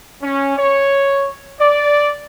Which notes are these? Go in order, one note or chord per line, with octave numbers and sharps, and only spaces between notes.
C#4
C#5
D5